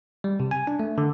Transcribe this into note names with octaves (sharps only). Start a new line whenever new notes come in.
G3
C3
G#5
D4
A3
D3